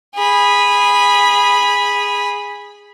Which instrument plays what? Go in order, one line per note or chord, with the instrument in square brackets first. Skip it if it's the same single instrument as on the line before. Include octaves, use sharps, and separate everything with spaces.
[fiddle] G#4 B5